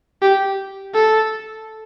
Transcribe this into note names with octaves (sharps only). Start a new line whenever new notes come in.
G4
A4